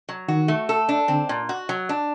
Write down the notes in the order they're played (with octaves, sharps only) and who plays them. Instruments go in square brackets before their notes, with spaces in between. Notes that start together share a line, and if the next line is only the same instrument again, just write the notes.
[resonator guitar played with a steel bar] F#3
[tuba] D#3 [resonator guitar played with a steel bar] F#4
[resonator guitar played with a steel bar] A3
A4
D4
[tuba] D3 [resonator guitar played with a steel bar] C4
[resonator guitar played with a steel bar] A#2
F#4
F#3
D4